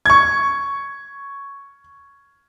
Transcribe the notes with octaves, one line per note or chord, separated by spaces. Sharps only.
C#6 G#6